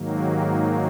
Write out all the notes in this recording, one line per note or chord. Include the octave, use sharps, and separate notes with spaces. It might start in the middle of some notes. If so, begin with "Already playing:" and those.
Already playing: G#2 D#3 F#3 A#3
G4